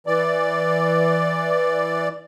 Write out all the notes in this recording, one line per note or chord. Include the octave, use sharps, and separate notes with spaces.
E3 D5